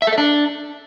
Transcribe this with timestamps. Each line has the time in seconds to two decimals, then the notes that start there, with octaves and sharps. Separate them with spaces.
0.02 E5
0.07 A4
0.12 E5
0.18 D4